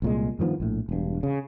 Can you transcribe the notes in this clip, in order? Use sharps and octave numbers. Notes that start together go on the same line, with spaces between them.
C2 A#2 G#3
G2 D#3 F3 B3
A#1 A2
E1 G2
C#3